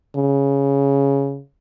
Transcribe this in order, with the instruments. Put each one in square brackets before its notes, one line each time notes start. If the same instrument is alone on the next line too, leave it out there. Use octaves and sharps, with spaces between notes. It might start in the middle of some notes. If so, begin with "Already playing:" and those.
[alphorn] C#3